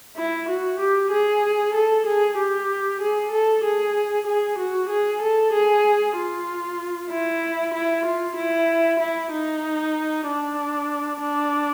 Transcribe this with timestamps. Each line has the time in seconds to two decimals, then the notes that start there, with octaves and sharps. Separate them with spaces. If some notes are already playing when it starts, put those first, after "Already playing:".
0.16 E4
0.49 F#4
0.79 G4
1.11 G#4
1.74 A4
2.06 G#4
2.37 G4
3.01 G#4
3.31 A4
3.64 G#4
4.27 G#4
4.58 F#4
4.89 G#4
5.22 A4
5.52 G#4
6.16 F4
7.10 E4
7.74 E4
8.05 F4
8.36 E4
8.99 E4
9.32 D#4
10.27 D4
11.20 D4